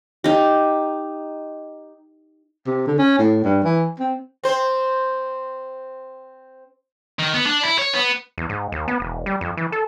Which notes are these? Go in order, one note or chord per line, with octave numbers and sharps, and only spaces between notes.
D#4 G4
C3
D3
C#4
A2
G2
E3
C4
C4 C5
D#3
B3
D4
E4
C#5
B3
E2
G#2
D#2
B3
E1
G3
F2
E3
A4